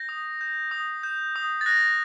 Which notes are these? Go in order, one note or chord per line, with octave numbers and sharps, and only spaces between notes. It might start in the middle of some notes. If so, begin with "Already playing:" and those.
Already playing: G6 A#6
D#6
G6
D#6
G6
D#6
A6
F#6 A#6